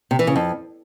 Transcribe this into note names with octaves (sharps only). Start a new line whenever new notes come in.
C3
E3
C#3
F2